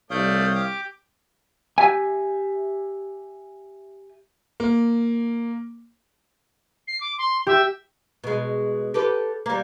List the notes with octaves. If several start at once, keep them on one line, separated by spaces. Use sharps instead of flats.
C2 A3 C#5 D5 F5 D#6 G6
G4 D6
G4 E5 G#5
A#3
C7
D6
C6
G4 E5
B2 G#3
G4 A4 B4
G3 A#3